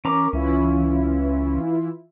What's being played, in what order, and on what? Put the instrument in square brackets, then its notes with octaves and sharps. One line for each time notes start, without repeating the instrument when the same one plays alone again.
[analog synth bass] E3 [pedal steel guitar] C#4 A#5 D6 [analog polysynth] A#4
[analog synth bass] C#2 [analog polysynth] E3 E4 F4 [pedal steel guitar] C#4